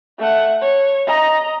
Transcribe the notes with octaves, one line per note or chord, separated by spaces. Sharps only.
A3 F#5
C#5
D#5 A#5